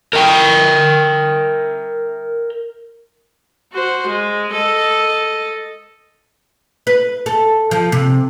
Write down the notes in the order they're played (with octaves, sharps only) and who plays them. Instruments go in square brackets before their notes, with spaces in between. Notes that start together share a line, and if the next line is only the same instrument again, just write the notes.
[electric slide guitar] A#4 E5 G5
[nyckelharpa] F#4 C5
G#3
A4 D#5
[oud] B4
A4
F3
C3